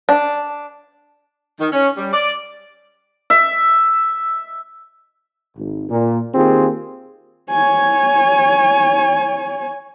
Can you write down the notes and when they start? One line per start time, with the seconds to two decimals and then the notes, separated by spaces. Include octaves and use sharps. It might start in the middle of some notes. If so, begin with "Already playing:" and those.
0.09 D4
1.60 D#3
1.72 C#4
1.97 G3
2.13 D5
3.30 E5
5.57 G#1
5.90 A#2
6.35 D#3 A#3 C4 F4 G4 G#4
7.50 C#5 G#5